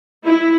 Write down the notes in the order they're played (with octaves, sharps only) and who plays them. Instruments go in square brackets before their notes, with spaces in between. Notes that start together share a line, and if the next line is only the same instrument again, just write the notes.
[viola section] E4